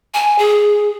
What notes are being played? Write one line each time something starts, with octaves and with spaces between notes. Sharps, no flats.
G#5
G#4